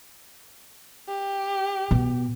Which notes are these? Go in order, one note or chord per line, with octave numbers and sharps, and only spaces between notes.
G4
B2